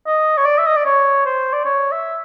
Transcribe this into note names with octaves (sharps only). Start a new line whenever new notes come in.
D#5
C#5
D5
E5
D#5
D5
C#5
C5
D5
C#5
E5